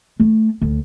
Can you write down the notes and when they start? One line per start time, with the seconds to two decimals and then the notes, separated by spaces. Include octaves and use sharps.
0.20 A3
0.61 D2